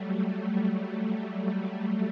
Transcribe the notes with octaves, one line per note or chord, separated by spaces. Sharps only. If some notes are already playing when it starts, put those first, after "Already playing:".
Already playing: F#3 G3 A3
A3